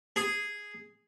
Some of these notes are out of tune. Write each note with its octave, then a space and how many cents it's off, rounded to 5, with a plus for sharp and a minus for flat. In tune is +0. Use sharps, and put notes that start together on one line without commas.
G#4 -5